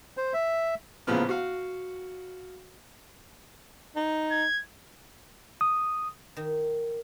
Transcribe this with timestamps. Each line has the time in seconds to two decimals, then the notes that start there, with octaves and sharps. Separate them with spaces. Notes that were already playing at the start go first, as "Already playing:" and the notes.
0.17 C5
0.34 E5
1.07 A1 A#2 C#3 F3 B3 F6
1.29 F#4 F5
3.96 D#4
4.31 G#6
5.61 D#6
6.37 D#3